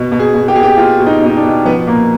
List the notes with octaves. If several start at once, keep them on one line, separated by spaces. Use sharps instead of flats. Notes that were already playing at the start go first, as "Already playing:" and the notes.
Already playing: B2
B2
G#4
B2
G4
B2 G#4
G4
B2 F4
B2
D#4
B2 D#4
D4
B2
F3 B3
A#2 A#3